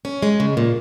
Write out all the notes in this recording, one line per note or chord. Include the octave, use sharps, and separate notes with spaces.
C#4
G#3
C#3
A#2